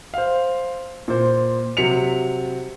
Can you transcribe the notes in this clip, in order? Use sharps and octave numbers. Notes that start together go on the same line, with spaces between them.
C5 F5
A#2 C5
C3 F#3 B6 C#7 F7